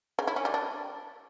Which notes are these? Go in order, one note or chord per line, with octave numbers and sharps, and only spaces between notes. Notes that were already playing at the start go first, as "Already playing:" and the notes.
C#3
E4
C#4
G3
D4